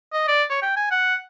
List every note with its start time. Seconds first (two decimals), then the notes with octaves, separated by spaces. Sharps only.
0.13 D#5
0.28 D5
0.50 C#5
0.62 G5
0.76 G#5
0.91 F#5